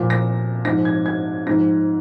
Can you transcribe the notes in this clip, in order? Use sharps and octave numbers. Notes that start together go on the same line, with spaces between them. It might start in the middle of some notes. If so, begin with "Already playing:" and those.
Already playing: A#2 F3
A#6
G#2 F3 A#6
G#6
G#6
G#2 F3 A#6